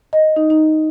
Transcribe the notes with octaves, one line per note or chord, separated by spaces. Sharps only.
D#5
D#4
D#4